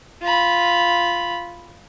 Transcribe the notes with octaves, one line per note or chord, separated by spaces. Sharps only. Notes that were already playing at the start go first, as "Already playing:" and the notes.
F4 B5